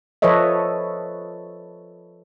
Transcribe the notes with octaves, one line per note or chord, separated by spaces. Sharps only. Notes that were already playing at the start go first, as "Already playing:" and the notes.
F3 A4 B4 C#5 D#5 E5